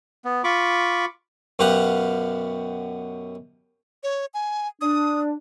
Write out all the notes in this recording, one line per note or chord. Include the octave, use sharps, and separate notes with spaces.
B3
F4 B5 C#6 D6
F#2 B2 G4 F5 F#5
C#5
G#5
D4 D#6